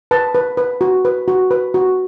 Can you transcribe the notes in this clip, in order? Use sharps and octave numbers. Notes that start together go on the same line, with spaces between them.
B4 A5
B4
B4
F#4
B4
F#4
B4
F#4